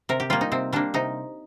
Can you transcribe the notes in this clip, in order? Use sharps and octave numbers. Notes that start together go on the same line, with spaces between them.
C3 A#4
G4
G3 A#3 F4
D#4
C3 C4
G3 A#3 D4
C3 D#4